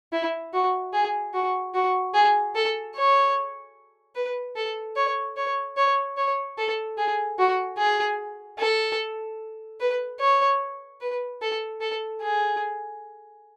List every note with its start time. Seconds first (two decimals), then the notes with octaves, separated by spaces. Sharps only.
0.12 E4
0.53 F#4
0.93 G#4
1.34 F#4
1.74 F#4
2.14 G#4
2.55 A4
2.95 C#5
4.15 B4
4.56 A4
4.96 C#5
5.37 C#5
5.77 C#5
6.17 C#5
6.58 A4
6.98 G#4
7.39 F#4
7.78 G#4
8.58 A4
9.80 B4
10.20 C#5
11.01 B4
11.42 A4
11.81 A4
12.22 G#4